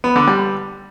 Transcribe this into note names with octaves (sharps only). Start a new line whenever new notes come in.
B3
D3
G3